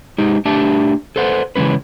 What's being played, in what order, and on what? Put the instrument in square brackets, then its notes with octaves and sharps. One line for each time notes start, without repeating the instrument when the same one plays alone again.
[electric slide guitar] G#3 D#4 G4
A3 D4 G4 E5 A5
A4 B4 C5 F#5
C#3 E3 G#3 C#4 B4